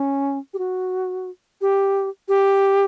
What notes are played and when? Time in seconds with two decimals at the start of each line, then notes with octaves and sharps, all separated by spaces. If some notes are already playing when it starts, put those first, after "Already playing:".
Already playing: C#4
0.54 G4
0.59 F#4
1.61 G4
2.28 G4